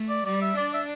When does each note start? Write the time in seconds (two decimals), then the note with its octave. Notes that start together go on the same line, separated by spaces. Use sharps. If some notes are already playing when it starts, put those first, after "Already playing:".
Already playing: A3
0.09 D5
0.25 G3 D5
0.42 E5
0.57 D4 D5
0.74 E5